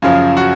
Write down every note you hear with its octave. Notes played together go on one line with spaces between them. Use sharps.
F#2 C#3 F3 F4
F#4